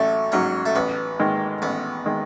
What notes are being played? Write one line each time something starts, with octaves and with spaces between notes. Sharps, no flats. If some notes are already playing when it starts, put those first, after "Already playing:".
Already playing: A1 F#3 A3
G#2 F#3 C#4
A3
A1 B3
G#2 D#3 G#3
A1 B3
D#3 G#3